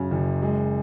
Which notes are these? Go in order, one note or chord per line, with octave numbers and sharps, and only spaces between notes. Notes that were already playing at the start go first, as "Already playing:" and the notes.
Already playing: F#2 C#3 F#3
F#1
G#3